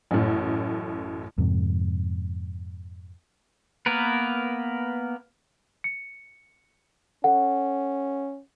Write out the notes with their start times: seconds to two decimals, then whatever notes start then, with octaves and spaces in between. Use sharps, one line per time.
0.11 A1 F#2 A2
1.38 F2 G#2 C3
3.86 A#3 B3 A#4 B4
5.84 C#7
7.24 C#4 A4 F#5